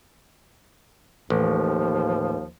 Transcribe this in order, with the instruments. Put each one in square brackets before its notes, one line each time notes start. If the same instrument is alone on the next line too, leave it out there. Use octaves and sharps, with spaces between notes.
[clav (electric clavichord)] A1 [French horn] D#2 [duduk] F3